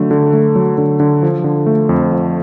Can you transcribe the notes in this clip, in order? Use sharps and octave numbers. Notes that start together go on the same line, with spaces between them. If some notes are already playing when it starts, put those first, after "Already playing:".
Already playing: D3 F#3 A3
D3
A3
F#3
D3
D3
F3
D3
A3
F2
F3